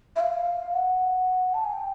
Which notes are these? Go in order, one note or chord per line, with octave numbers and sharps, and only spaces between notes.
E5
F5
F#5
A5
G#5
G5